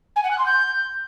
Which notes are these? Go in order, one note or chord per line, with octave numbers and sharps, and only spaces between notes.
G#5
F#5
F#6
C6
G6